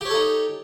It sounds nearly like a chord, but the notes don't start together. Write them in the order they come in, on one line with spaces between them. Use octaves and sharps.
G4 C#5 A4 D#4